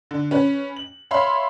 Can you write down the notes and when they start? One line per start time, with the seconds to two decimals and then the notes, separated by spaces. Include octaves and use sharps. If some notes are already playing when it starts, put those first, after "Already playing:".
0.11 D3
0.31 C#4 B4
0.76 F#7
1.11 C#5 E5 F5 B5 C6